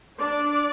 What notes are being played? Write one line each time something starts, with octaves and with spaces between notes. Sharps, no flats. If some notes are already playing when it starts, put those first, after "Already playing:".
D4 D5